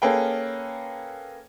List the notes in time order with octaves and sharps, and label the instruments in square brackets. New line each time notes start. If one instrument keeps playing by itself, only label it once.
[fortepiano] A#3 C#4 G#4 A4 B4 G5